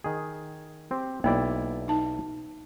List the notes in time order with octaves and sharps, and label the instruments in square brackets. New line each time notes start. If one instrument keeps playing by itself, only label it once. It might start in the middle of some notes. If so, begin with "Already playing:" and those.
[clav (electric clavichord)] D#3 G#4
C4 G4
[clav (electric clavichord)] B1 E4 D5 [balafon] A#3
[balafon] D#4 A5